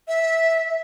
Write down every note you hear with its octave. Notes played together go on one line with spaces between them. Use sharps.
E5